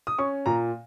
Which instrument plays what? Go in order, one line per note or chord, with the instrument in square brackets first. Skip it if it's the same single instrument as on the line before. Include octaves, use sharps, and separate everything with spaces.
[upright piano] D#6
C#4 C#6
A#2 A#5